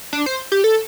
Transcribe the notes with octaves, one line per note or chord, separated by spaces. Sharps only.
D4
C5
G4
A4